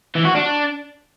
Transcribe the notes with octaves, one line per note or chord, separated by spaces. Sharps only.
E3
F#4
D4